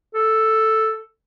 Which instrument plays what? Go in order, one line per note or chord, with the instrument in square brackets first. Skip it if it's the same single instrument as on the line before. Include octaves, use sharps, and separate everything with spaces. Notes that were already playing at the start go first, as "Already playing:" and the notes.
[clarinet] A4